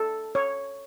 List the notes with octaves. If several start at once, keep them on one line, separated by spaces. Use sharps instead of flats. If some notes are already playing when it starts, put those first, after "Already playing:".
Already playing: A4
C#5